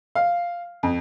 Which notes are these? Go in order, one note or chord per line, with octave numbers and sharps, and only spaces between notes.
F5
F2